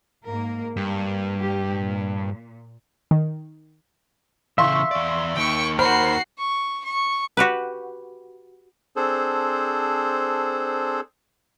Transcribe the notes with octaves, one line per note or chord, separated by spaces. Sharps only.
G#2 A#3 A#4
G2 A#3
G3 G4
A#2
D#3
C#3 E3 E5 F5 C6 C#6
E2 D5
D#2 D#3 G5 C#6
F#4 A#4 C5 B5 C7
C#6
C#6
F#4 G4 B4
C4 D4 G#4 A4 C5